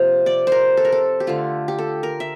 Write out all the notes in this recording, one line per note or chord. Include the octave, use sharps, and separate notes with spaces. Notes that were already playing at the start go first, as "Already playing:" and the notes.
Already playing: C3 F3 A#3 C5 F5
D5
A#4 C5
A4
A#4
A4
G4
D3 A3 F4
G4
A4
A#4
E5